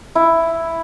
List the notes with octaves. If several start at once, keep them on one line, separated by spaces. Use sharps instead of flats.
E4